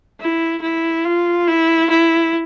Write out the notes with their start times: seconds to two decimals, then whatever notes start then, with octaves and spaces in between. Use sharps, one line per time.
0.20 E4
0.62 E4
1.05 F4
1.48 E4
1.90 E4